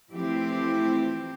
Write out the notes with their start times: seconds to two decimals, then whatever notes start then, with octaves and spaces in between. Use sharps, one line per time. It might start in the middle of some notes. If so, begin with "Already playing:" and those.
0.12 E3 F3 A3 C4 E4 G4